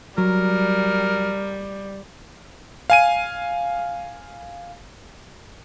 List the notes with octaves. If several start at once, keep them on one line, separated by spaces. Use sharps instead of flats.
F#3 G3 A#4
F5 G#5 D#7